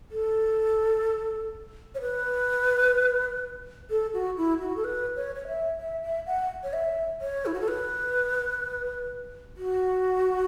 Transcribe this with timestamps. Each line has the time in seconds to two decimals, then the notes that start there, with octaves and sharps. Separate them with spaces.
0.11 A4
1.95 C#5
2.01 B4
3.90 A4
4.14 F#4
4.37 E4
4.61 F#4
4.76 A4
4.84 B4
5.16 C#5
5.35 C#5
5.47 E5
5.79 E5
6.03 E5
6.27 F#5
6.64 C#5
6.73 E5
7.21 C#5
7.46 E4
7.53 F#4
7.61 A4
7.68 B4
9.57 F#4